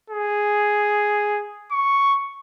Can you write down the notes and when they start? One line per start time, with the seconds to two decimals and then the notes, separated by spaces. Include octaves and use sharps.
0.10 G#4
1.72 C#6